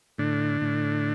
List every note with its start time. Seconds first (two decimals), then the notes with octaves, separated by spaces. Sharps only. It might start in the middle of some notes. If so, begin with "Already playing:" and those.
0.18 A2 D3 D4
0.61 A2